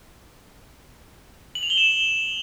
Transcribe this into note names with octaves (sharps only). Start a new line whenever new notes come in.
F#7
F7
G7
E7